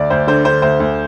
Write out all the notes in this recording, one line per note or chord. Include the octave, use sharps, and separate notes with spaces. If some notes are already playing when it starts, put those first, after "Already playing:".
Already playing: D2 D5
D2 C5
D3 C5
D3 C5
D2 C5
D2